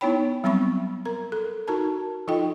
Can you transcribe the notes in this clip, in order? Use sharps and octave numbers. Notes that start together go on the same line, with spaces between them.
B3 D#4 E4 C#5 G5 B5
F#3 G3 B3 C4 B5 C#6
A#4 A#5
A4
D#4 F#4 A#4 A5 A#5
F3 D#4 F4 A4 D#5 G5